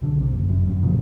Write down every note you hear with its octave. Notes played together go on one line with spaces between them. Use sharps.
B1 D3
C3
F#1
F#2
G#1 F#2
A#2 C#3 F3 F#3